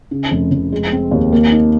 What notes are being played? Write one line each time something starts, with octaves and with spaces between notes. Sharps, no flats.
C#3
F1
F1
G#3
C4
D#2
A#3
D#4